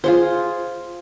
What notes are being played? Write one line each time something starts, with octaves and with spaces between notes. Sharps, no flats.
F4 G#4 C5